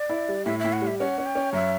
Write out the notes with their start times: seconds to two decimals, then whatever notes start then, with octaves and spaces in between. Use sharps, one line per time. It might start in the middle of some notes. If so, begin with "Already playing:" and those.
Already playing: D5
0.10 E4
0.29 G3
0.45 A2 E5
0.59 A2 E5
0.73 F#5
0.81 G3
0.87 E5
0.99 C#4 F#5
1.18 C#4
1.26 G5
1.35 C#4
1.53 F#2 E5